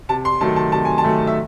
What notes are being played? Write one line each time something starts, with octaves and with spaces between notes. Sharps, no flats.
C3 A5
C6
D#3 F#3 A3 A5
A5
C3 A5
G#5
A5
D#3 F#3 A3
E5